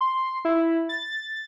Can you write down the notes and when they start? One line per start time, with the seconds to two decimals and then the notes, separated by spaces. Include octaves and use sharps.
0.01 C6
0.45 E4
0.89 A6